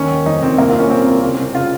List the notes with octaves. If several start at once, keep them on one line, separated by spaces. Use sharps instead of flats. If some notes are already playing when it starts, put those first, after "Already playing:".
Already playing: D#2 D#3 C#4
D#3
F2 D#4
D#3 C4
C2 A#3
F4
C2 C#4
A#2 C4
C2
C#3
C#3
C#3 F4